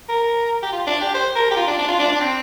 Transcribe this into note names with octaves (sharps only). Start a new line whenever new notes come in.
A#4
G4
F4
D4
G4
C5
A#4
G4
F4
D4
D4
F4
D4
D4
C4